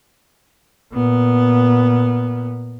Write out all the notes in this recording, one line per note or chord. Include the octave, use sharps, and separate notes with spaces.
A#2 B3